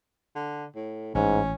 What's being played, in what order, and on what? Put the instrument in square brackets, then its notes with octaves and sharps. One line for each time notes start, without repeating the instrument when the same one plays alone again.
[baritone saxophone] D3
A2
[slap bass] A1 [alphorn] G#2 [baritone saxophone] C#4